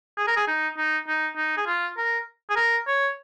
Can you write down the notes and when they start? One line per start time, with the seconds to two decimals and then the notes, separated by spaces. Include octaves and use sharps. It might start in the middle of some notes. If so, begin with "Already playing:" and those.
0.17 G#4
0.27 A#4
0.36 G#4
0.47 D#4
0.78 D#4
1.08 D#4
1.37 D#4
1.57 G#4
1.67 F4
1.97 A#4
2.50 G#4
2.56 A#4
2.87 C#5